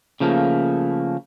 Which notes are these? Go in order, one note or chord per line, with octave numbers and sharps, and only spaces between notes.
C#3 F3 A3 A#3